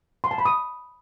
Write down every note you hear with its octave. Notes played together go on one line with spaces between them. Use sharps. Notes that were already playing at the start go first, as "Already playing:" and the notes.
C6
A5
B5
D#6